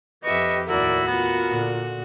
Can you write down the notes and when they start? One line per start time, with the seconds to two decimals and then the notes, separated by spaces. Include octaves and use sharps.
0.24 F2 G4 B4 D#5 E5 C#6
0.69 D#2 A2 E4 F#4 A#4 D5
1.07 B3 F4 A#4
1.49 A#2 D3